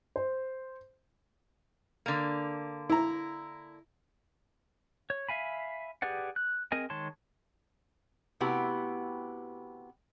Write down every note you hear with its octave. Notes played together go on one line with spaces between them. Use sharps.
C5
D3 A#3
E4 A#5
C#5
E5 F5 G#5 B5
G4 G#4 B4 D5 F#5
F#6
C4 G#4 A#4 D#5 G#5
D#3 G#3 C#5 A5 C6
C3 A3 B3 E4 F#4 G4